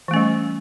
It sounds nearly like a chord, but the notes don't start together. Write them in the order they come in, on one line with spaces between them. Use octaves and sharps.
E3 A3 C#4 G3